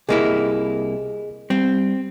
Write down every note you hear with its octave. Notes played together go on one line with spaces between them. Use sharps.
C2 A#3 E4 G#4 D#5
G3 C4